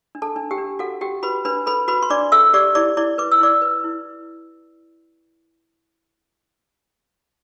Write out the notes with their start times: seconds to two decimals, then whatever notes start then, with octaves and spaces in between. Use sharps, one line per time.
0.15 D4
0.22 A4 A5
0.36 D4
0.51 G4 G5
0.58 D4
0.79 F#4 A4 F#5
1.01 F#4 G4 G5
1.23 F#4 B4 B5
1.45 D4 B4 B5
1.66 A4 B4 B5
1.88 F#4 B4 B5
2.03 C6
2.10 D4 D5 D6
2.32 A4 E5 E6
2.54 G4 D5 D6
2.75 E4 D5 D6
2.97 E4 D5 D6
3.18 B4 D6
3.31 E6
3.40 E4 D5 D6
3.62 B4
3.84 E4